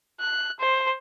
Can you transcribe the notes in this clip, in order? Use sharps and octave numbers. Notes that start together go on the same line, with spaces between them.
F#6
C5